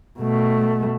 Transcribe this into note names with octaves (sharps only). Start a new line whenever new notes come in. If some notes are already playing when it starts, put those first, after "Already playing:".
B2 A3